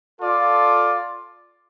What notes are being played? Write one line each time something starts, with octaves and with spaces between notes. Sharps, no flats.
F4 A4 D5